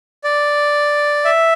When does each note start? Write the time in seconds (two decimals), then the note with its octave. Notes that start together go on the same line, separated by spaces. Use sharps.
0.24 D5
1.25 E5